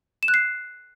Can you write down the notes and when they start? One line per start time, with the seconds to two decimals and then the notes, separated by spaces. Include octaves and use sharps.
0.23 E7
0.28 F#6
0.34 C7